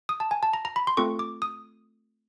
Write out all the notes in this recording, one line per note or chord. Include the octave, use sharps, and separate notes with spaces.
D#6
A5
G#5
A5
A#5
A#5
B5
C6
A3 C4 F4 A4 C#6
D6
D#6